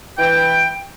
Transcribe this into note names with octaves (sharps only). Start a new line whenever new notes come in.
E3 G5